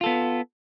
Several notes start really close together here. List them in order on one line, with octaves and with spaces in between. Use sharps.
F4 A4 B3